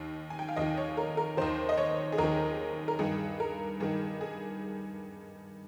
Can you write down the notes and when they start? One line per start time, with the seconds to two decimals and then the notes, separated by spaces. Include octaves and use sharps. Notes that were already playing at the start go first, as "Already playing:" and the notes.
Already playing: D#2 D#3
0.30 G#5
0.39 G5
0.49 F5
0.56 D#2 D#3 D#5
0.77 C#5
0.97 A#4
1.17 A#4
1.37 D#2 D#3 C5
1.69 D#5
1.77 C#5
2.12 G#4
2.18 D#2 D#3 A#4
2.88 A#4
2.99 G2 D#3 G#4
3.40 A#4
3.80 G2 D#3 G#4
4.21 G#4